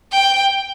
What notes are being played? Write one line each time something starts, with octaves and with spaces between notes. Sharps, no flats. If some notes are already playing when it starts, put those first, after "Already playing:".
G5